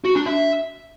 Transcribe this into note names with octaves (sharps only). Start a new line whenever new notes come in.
F#4
D4
E5